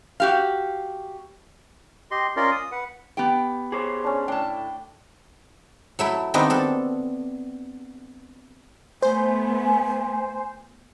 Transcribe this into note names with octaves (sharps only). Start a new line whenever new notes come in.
F#4 G4 F5
G4 D#5 C6
C#4 F4 A#4 D5 D#5 C6
D#6
B4 F#5
B3 G4 G5
G#4 C5 C#5 D6
C#4 D4
A2 D4 G5 A5
F#3 A3 E4
D#3 G3 B3 C4 D4 D#4
D4 A4
A3 B3 C5 G#5